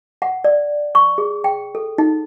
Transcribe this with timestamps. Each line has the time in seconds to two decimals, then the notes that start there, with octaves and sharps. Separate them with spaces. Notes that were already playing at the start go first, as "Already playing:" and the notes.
0.22 F#5
0.44 D5
0.95 C#6
1.18 G#4
1.44 G5
1.75 A4
1.98 D#4